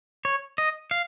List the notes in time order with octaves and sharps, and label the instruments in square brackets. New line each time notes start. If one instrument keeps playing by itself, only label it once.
[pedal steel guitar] C#5
D#5
F5